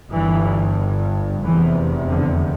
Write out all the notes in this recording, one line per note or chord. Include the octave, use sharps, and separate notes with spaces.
G1 G2 E3
F1 E2 C3 E3
D3